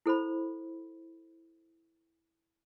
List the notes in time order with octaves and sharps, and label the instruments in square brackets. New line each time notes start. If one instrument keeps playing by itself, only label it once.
[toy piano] E4 A4 C5 B5